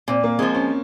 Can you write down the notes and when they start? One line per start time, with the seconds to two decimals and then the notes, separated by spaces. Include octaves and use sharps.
0.08 A#2 C4
0.24 A#3
0.39 G#3 C4
0.42 F3
0.55 C#4